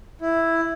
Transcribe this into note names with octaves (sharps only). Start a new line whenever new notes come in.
E4